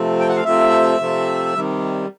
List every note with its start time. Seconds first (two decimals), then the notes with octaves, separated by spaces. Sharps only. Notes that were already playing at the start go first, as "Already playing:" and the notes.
Already playing: C3 F3 A3 C4
0.20 G5
0.29 F#5
0.36 F5
0.44 C3 F3 A3 C4 E5
0.99 C3 F3 A3 C4
1.55 C3 D#3 G3